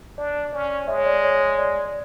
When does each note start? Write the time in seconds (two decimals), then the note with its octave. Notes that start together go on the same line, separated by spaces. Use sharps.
0.18 D4 D5
0.53 C#4 D5
0.87 G#3 C#5 E5
0.98 C#5
1.06 D5
1.23 C#5
1.58 D5
1.85 D5